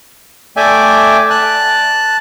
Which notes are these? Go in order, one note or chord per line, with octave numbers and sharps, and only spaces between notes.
A3 D5 E5 G5 G#5
A5 F#6